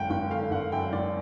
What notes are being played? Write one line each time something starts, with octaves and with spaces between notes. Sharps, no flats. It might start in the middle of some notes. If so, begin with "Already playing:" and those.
Already playing: G#1 F#2 D3 F#5 G5
G#1 G5
D3 F5
G#1 F#5
F#2 G5
G#1 D5